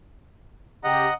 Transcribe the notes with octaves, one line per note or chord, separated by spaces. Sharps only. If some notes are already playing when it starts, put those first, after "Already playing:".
C#3 C#4 G4 D#5 F#5 A#5